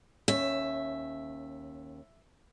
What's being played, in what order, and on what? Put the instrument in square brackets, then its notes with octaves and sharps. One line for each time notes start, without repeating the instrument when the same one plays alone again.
[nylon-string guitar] D#2 C#4 [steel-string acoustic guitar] E5